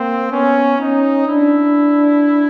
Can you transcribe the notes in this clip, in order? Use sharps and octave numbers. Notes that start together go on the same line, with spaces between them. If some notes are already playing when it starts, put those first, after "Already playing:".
Already playing: A#3 C4
B3 C#4
C#4 D#4
D4 E4